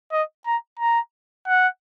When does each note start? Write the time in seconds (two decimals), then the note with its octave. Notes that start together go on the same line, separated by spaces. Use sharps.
0.12 D#5
0.46 A#5
0.80 A#5
1.47 F#5